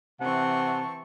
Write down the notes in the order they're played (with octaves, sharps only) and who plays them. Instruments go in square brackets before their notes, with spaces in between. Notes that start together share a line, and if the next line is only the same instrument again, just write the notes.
[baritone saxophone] C3 [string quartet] E3 C4 C#6 [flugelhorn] F#5 [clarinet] A5